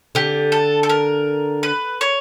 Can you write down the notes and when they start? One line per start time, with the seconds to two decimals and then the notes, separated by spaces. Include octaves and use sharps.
0.15 D3 G4
0.52 A4
0.83 A4
0.89 A#4
1.63 B4
2.01 C#5